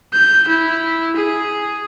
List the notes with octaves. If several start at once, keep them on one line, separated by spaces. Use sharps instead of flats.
G6
E4
G#4